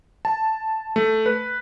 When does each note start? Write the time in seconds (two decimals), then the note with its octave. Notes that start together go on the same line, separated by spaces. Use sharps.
0.25 A5
0.96 A3
1.26 B4